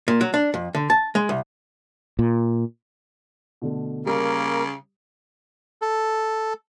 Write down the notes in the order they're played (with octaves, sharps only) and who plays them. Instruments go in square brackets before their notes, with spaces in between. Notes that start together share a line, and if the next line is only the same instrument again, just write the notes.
[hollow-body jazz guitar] A#2
F#3
D4
F2
D3
A5
G#3
C2
[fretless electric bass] A#2
[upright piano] B2 D3 A3
[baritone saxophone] C#3 [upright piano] G3 [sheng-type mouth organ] A#3 A#4
[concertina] A4